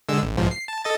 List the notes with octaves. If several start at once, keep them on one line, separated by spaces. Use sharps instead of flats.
D3 G#3 E6
A1
B1 G#2 F3
C7
A5
A4 D#5 A6